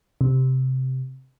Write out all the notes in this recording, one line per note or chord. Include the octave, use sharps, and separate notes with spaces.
C3